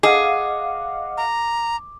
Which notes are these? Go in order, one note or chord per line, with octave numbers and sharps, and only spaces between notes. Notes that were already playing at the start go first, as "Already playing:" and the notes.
G#4 D#5 F5 F#5 D6
A#5